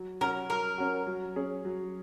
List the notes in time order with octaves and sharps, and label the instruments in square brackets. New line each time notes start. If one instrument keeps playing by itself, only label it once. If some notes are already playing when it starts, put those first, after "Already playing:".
Already playing: [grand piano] F#3
[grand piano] C#4 F#4 [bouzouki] A#4
[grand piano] F#3 [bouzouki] A#4
[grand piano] C#4 F#4
F#3
C#4 G#4
F#3